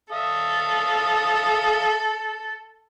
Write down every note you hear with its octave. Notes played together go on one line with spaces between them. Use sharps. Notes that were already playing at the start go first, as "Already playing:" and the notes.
A4 E5 F5 D#6